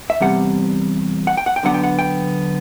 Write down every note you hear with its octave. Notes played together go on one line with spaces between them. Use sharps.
E5
E2 C3 G3 F#5
F#5
G5
F#5
G5
D3 F#3 B3 D4 F#5
G5
F#5
G5